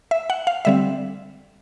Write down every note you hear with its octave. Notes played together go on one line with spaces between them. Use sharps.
E5
F#5
F5
D3 G3 C4 E5